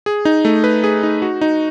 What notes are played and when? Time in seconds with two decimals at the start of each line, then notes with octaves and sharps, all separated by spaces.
0.06 G#4
0.25 D#4
0.45 A3
0.64 B4
0.84 G#4
1.03 D#4
1.22 F#4
1.41 D#4